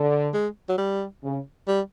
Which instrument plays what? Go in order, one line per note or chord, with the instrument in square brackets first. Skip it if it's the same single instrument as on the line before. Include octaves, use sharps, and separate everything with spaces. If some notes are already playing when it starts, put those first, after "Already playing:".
Already playing: [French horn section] D3
[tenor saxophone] G#3
F#3
G3
[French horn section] C#3
[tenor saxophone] G3